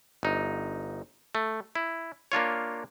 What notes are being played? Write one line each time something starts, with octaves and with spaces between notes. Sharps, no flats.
G1 D#4
A3
E4
A#3 D4 F4 C#5